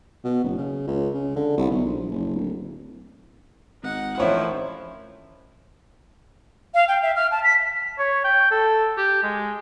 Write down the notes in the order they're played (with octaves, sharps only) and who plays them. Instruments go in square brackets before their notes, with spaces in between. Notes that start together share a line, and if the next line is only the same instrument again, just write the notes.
[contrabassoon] B2
F#1
C#3
C#2
C#3
D3
C2
B1
A#1
F#1
D1
[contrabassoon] G#1 [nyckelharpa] D#4 F#5
[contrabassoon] A1 [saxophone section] D#3 F3 [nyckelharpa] E4 [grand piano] C5 C#5 E5
[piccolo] F5
G5
E5
F6
A5
B6
[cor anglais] C#5
G5
A4
G4
G#3